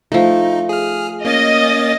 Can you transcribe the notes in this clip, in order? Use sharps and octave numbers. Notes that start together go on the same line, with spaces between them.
F3 A3 D#4
G#4 F6
A#3 C#4 D#5 A6